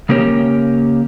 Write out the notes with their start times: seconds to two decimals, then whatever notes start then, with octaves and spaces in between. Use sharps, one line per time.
0.09 C#3 A#3 C#4 G4 C#5